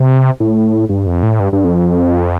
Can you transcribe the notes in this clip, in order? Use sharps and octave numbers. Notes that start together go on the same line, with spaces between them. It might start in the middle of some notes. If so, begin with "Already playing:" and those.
Already playing: C3
A2
G2
F2
A2
G2
G2
F2